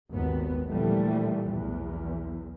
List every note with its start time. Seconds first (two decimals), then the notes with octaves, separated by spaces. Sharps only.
0.11 G#1 D#2 B3
0.68 A#2 D3 E3 F3 G3 A3
1.49 B1 E2